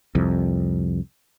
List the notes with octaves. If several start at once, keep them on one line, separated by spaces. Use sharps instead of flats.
C2 F2